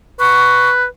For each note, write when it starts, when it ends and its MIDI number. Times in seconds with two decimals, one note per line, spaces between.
0.20 0.85 71
0.20 0.70 85